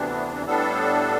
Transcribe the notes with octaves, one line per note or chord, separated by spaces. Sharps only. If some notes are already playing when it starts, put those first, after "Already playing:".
Already playing: D2 C3 E3 B3 D4
A2 G3 B3 D4 A4